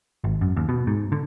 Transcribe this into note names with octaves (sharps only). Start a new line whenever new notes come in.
G#1
F#2
D#2
B2
G#2
D3